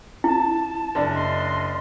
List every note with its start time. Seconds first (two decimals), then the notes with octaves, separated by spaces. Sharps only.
0.24 E4 A5
0.95 F#1 D4
1.13 D#5 C6